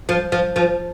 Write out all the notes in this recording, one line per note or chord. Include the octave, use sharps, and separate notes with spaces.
F3
F3
F3